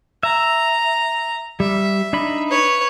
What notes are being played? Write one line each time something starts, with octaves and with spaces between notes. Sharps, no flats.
E5 A#5
G3 E5
D4 D#4 B5
B4 C#5